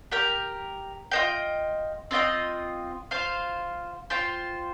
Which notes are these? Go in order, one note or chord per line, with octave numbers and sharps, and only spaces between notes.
G4 A#4 G5
F4 C5 D#5 G5
C4 F4 D#5 G5
F4 C5 F5
F4 C5 G5